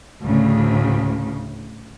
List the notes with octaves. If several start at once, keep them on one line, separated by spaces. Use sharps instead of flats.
D2 A2 C#3